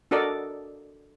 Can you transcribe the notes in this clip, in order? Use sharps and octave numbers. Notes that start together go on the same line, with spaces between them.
D4 F#4 A4 A#4 D5 D#5